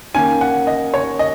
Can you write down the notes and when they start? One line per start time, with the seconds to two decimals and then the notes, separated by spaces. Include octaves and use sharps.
0.15 D#3 A#3 C#4 G#5
0.41 F#5
0.67 D#5
0.94 C#5
1.19 D#5